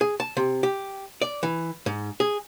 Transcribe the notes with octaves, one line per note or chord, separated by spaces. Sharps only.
G#4
A5
C3
G4
D5
E3
G#2
G#4